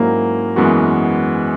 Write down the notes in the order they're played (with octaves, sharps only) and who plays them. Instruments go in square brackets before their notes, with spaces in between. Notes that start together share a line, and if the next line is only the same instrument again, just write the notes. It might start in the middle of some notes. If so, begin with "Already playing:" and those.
Already playing: [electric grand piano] G#2 F#3 C#4 E4 [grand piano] A#3
[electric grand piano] F#2 E3 G#3 B3 F#4